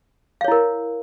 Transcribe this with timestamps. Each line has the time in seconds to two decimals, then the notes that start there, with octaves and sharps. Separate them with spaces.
0.41 F5
0.44 C#5
0.48 E4
0.52 A#4